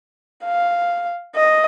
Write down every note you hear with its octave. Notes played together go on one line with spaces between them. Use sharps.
F5
D#5